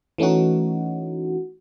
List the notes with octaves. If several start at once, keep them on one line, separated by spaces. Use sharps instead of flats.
E3 A3 C#4 D#4 F#4